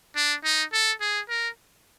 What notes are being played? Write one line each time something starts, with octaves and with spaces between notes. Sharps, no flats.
D4
D#4
A4
G#4
A#4